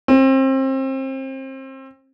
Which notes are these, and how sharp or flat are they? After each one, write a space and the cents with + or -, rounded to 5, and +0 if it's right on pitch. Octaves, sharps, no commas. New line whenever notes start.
C4 +30